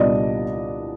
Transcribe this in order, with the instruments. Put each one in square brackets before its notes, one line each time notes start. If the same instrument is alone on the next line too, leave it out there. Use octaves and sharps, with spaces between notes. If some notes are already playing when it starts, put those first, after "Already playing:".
Already playing: [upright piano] C2 A#2 G3 B3 D4 D5 D#5